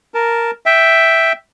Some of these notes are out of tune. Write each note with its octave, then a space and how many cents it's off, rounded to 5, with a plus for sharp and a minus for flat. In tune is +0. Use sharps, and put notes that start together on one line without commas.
A#4 +0 A5 +0
E5 +0 G5 +0